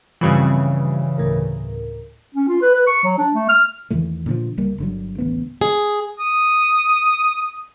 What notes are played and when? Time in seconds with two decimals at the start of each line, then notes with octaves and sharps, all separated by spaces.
0.21 G2 C#3 E3 F3 G3 C4
1.18 D2 A2 A#4
2.35 C#4
2.48 F4
2.62 B4
2.74 B4
2.87 C#6
3.04 F#3
3.18 D4
3.34 A3
3.49 F6
3.90 E2 D#3 E3 A3
4.26 A#2 D3 F3
4.57 C2 G3 A#3
4.78 G1 D3 F#3
5.18 A1 D2 B3
5.61 G#4
6.20 D#6